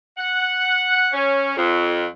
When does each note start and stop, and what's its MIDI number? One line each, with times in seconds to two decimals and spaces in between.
0.18 1.08 78
1.13 1.53 61
1.56 2.06 41